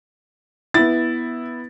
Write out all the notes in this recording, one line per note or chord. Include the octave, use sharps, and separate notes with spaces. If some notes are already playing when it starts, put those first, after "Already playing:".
B3 E4 A6